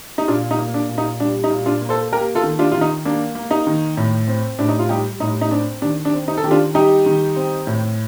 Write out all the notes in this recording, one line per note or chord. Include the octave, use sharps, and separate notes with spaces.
D#4
A#2 D4 F4
D#4
A#3
D4
A#2
D#4
G3 D4
D#4
A#2
D4 F4
A#3
A4 C5
A#3 G4 A#4
F4 A4
D#3
D4 F4
D#3 F4
D#4
A#3 D4
A#3
D#4
D#3
A2
C4
A2 D4
D#4
F4
G3 D#4 G4
A2 D#4
D#4
C4 D4
D#3 D4
D4
C4
D#4
A4
D#3 G4
D4 F4
G3 D#4 G4
D#3
C4
A2